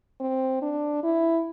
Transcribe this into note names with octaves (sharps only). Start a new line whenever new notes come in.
C4
D4
E4